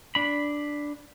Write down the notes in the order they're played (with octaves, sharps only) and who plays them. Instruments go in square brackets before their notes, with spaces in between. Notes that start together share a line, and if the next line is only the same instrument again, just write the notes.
[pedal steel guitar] D4 B5